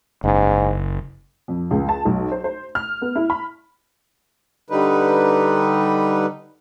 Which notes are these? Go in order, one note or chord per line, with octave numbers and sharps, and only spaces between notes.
F#1 G#2
F2
C#2
A5
B1
C5
C5
F6
B3
E4
B5
D3 G3 D#4 B4